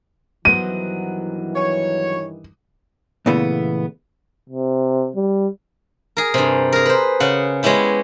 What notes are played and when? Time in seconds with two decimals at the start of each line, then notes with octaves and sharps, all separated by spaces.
0.45 G2 D#3 E3 F#3 B3 C5 D#7
1.56 C#5
3.26 A#2 C#3 E3 A3 B3
4.50 C3
5.16 G3
6.17 G#4 A#4
6.34 G2 C3
6.73 G#4 A#4
6.86 B4 C5
7.20 C#3 F#5
7.63 G#3 B3 C#4 E4 G4